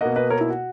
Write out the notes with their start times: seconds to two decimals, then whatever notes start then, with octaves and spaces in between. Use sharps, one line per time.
0.01 B2 A#3 D#5 F#5
0.16 B4 D#5
0.30 A#4 C#5
0.41 E4
0.50 F#4